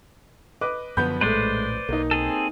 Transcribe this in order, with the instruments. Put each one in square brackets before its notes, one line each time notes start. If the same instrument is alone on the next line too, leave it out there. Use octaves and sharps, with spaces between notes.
[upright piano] B4 D#5 D6
[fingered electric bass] F#2 D3 F3 [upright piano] B3 B5 G6
[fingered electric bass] A#1 A2 [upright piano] G#3 A3 [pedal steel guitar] B4 C5 D5
[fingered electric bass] B1 [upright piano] A#3 D#4
[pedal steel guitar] C4 G#4 A4